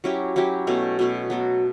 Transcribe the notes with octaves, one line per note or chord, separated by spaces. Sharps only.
F#3 C#4 E4 G4
F#3 C#4 E4 G4
B2 A3 C#4
B2 A3 C#4
F#3 B3 F#4 A4